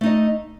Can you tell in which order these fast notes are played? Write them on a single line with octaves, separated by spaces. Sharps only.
A3 D#4 D#5